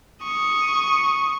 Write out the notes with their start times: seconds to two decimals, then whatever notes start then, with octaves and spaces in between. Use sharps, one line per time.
0.24 C#6 D#6